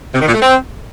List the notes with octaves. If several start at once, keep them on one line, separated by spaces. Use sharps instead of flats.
C3
D#3
A#2
A3
C4